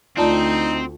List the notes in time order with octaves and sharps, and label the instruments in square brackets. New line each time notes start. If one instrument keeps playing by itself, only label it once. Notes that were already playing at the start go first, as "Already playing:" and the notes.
[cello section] D2 [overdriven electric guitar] C4 [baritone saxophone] D#4 [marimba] F4 D5 A5